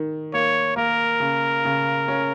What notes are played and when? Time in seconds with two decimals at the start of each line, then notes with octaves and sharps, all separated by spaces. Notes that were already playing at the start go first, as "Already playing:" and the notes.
Already playing: D#3
0.34 A#3 C#5
0.76 A#3 A#4
1.20 C#3
1.65 C#3
2.08 C#4